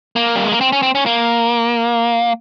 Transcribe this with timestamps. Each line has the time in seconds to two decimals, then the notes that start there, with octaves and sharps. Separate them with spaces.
0.16 A#3
0.36 G3
0.44 G#3
0.51 A#3
0.61 C4
0.72 C#4
0.82 C4
0.95 C#4
1.06 A#3